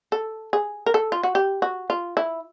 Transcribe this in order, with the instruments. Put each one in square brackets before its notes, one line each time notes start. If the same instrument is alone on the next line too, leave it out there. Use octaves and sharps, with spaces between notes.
[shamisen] A4
G#4
A#4
A4
F4
F#4
G4
F#4
F4
E4